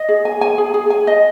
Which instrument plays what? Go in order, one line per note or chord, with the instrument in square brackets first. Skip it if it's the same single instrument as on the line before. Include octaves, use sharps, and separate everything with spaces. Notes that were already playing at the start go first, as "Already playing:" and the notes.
Already playing: [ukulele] D#5
G#4
G#5
G#5
G#4
G#4
G#5
D#5